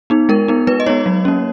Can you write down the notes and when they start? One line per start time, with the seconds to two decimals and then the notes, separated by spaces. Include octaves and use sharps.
0.10 B3 D#4
0.29 G#3 A#4
0.48 B3 D#4
0.67 G#3 B4
0.80 D#5
0.86 B3 D#4 C#5
1.06 F#3
1.25 A#3 C#4